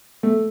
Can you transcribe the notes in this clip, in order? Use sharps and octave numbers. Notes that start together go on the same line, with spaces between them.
A3